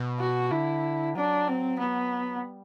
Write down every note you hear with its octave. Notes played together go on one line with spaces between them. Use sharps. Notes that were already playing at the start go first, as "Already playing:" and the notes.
Already playing: B2
F#4
D3 E4
F#3 D4
C4
B3
G3